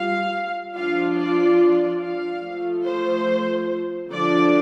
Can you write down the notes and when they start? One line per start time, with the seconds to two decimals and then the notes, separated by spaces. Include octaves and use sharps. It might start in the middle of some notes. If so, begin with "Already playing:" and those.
Already playing: G3 F4 F5
0.75 F3 D4 F4 F5
1.17 D5
1.59 D5
2.01 F5
2.43 F3 A3 F4
2.85 C5
4.10 D3 F3 D4 D5